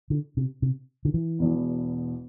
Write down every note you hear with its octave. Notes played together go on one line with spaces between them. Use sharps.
D3
C3
C3
D3
E3
E1 E2 B2